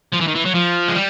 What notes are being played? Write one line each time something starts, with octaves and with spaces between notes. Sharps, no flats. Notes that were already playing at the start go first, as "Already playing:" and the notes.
F3
E3
D#3
E3
F#3
F3
G#3
G3